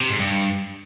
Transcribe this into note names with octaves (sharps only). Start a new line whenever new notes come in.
C3
G#2
G2